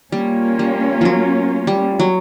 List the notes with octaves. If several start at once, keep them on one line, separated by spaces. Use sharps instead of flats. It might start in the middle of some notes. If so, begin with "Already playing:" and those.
G3 A#3 C#4 F4
G3
F3 F#3
G3
F#3